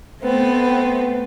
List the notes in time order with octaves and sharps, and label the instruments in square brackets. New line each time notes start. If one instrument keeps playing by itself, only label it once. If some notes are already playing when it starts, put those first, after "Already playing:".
[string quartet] A3 B3 C4